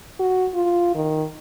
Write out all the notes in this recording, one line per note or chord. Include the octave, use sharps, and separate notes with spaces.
F#4
F4
D#3